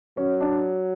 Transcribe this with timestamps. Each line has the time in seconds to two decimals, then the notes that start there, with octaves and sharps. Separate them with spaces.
0.17 F#3 C#4
0.40 D4